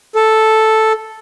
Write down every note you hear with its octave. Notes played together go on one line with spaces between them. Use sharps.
A4